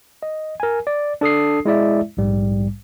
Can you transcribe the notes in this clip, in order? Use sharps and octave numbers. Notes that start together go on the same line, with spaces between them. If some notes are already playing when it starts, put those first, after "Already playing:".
D#5
A#4 G#5
D5
D4 A4 D#6 C7
G#3 E4 D5 E5
A#1 G#2 G3